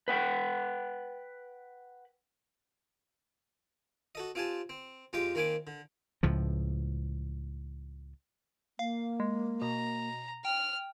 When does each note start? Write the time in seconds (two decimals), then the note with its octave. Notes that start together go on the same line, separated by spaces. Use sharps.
0.08 B4 F#5 G5
4.15 F#4 A4 D#5
4.35 C4 F4 G4 G#5 A5
4.69 C4
5.13 F2 G#3 F4 G4 G5 D6
5.35 D#3 A#3 C4 G#5 B5 D6
5.67 D3
6.23 C#2 A2 F3
8.79 A#3 F5
9.20 G#3
9.62 B2 A#5
10.45 G5 F6